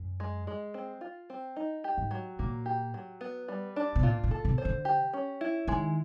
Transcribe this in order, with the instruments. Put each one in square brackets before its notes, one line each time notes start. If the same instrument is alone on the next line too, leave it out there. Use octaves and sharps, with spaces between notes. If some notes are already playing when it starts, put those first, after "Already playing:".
Already playing: [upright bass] F#2
[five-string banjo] G#3
G#3
C4
F4
C4
D#4
G4
[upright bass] G#2
[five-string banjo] F#3
[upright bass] A#2 [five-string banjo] A#3
[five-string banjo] G4
F#3
B3
G3
D4
[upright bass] B2
[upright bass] A#2 [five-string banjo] F4
[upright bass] A#2
[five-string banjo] A4
[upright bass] B2
[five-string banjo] C5
[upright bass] D3
[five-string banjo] G4
C#4
E4
[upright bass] D#3 [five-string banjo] G#3